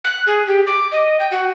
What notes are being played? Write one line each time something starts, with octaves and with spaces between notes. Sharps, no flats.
F#6
G#4
G4
D6
D#5
G5
F#4